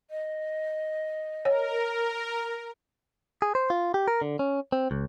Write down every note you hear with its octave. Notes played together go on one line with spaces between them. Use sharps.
D#5
A#4 C#5
G#4
C5
F4
G4
A#4
D3
C#4
C4
C#2